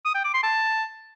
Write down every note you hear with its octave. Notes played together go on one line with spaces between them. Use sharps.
D#6
G5
D6
C6
A5